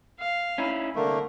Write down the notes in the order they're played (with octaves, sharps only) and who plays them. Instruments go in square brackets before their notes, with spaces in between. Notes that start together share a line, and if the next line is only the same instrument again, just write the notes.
[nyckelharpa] F5
[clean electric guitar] C#4 D#4 E4
[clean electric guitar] C2 [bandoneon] D3 A3 A#3 [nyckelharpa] A#4